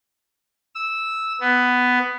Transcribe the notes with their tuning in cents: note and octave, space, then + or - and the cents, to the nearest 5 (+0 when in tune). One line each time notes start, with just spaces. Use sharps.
E6 -10
B3 +10